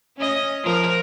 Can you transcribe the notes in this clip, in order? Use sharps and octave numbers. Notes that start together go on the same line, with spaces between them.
C#4 D#5
F3 A#4